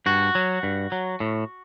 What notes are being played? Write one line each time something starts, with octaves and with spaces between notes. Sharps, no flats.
G2 F#4
F#3
G2
F#3
A2